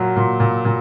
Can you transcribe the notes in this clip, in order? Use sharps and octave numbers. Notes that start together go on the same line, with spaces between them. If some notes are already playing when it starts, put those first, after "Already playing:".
Already playing: A#2 F#3
A#2
A#2
A#2